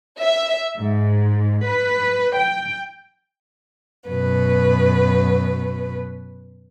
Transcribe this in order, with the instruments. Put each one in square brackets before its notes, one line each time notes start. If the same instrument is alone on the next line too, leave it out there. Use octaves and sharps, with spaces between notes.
[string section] E5
G#2
B4
G5
[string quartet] F#2 B2 B4